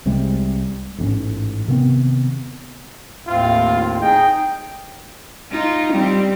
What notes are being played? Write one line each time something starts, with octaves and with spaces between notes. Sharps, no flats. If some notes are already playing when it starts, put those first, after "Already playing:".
C2 C3 G3 G#3
A1 G#2 C4 C#4
C3 D#3 B3 C4
D#2 A2 C4 F4
D#4 G#4 D#5 G5
D#4 F4
G3 C4